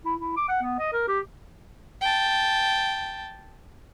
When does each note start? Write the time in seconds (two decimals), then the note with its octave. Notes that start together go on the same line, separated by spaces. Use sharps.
0.05 E4
0.20 E4
0.37 D6
0.49 F#5
0.62 B3
0.79 D#5
0.93 A#4
1.08 G4
2.01 G5 A5